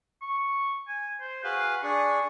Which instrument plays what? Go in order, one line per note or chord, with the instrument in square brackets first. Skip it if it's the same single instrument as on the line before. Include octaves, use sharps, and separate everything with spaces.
[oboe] C#6
G#5
C5
[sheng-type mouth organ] F#4 G#4 F5 [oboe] B4
[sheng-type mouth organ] D4 G#4 [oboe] C#6